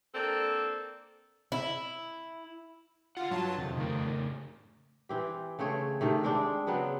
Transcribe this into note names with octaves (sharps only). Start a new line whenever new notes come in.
A#3 C4 D4 A4
E4
D3 F4 F#5
G2 F#3 F4 A5
F2 C3 D#3
C#3 A3 A#4
E3 C4 G4
C#3 A3 C4 C#5
C3 D#3 A3
G#3 C4 D4
C#3 F#3 B3 C4